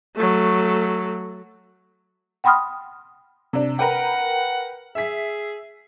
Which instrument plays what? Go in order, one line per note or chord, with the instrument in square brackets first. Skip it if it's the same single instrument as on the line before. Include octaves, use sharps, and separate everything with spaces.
[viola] F#3 A3
[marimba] F#5 G5 B5 C6 D#6 F6
[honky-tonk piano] C3 D4
[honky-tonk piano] A#4 B4 G5 [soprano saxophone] F#5
[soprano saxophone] G#4 [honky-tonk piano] E5 B6